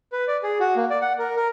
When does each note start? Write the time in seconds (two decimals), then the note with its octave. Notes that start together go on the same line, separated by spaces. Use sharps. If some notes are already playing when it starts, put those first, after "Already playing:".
0.12 B4
0.28 D5
0.43 G#4
0.60 F#4
0.76 A#3
0.90 D5
1.01 F#5
1.19 A#4
1.36 A#4